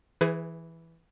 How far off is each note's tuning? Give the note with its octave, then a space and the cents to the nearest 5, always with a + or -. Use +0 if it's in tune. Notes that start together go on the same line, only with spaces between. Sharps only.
E3 +0 G#4 +0 B4 +40